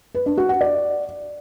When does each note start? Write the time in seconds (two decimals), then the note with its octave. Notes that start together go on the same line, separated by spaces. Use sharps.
0.15 B4
0.26 D4
0.38 F#4
0.49 F#5
0.61 D5